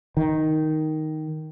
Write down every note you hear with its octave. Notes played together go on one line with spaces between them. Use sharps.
D#3